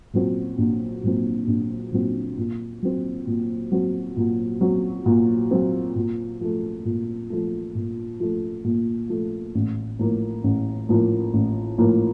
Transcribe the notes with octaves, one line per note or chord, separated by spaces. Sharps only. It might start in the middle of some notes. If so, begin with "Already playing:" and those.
A#2 F#3 C4
A#1
A#2 F#3 C4
A#1
A#2 F#3 C4
A#2
F#3 C4
A#2
F#3 C4
A#2
F#3 C4
A#2
F#3 C4
A#2
F3 A3
A#2
F3 A3
A#2
F3 A3
A#2
F3 A3
A1
A2 F3 A#3
A1
A2 F3 A#3
A1
A2 F3 A#3